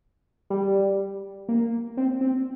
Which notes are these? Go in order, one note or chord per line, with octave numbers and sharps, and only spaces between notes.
G3
A#3
C4
C4